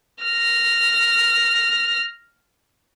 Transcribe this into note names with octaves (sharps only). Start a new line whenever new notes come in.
F6 A#6